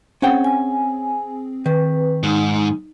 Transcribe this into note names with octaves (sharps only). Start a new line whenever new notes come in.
C4 C#4 G#4 F#5 G5
G#5
D#3 B4
G#2 D#4